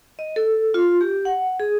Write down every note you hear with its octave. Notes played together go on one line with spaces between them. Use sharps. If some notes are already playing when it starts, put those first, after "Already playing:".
D#5
A4
F4
G4
F#5
G#4